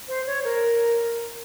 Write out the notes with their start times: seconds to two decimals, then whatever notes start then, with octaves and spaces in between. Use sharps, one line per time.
0.08 C5
0.27 C#5
0.45 A#4